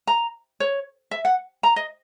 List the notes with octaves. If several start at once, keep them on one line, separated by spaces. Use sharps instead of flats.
A#5
C#5
E5
F#5
A#5
D#5